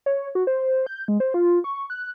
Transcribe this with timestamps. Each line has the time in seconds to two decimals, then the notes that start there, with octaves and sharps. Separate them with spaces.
0.06 C#5
0.35 F#4
0.47 C5
0.86 G6
1.08 G#3
1.20 C5
1.34 F4
1.64 C#6
1.90 F#6